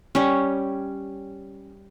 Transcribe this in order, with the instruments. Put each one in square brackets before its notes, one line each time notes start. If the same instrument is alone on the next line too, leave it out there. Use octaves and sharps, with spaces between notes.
[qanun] G3 C#4